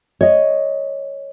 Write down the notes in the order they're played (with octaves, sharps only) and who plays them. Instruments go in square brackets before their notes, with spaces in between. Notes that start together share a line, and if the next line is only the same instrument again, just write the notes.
[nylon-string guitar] C#5 D#5